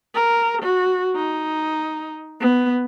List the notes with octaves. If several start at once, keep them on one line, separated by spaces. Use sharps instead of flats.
A#4
F#4
D#4
B3